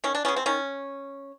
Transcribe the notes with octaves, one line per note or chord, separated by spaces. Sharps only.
D#3 C#4
D4
G#3 B3 C#4
C4
D#3 C#4